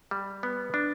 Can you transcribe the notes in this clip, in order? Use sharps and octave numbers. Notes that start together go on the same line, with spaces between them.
G3
B3
D4